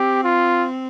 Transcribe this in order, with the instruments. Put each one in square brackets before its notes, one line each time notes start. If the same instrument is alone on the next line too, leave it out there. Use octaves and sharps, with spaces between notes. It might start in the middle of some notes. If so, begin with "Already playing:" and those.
Already playing: [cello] C4 [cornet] G4
[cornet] F4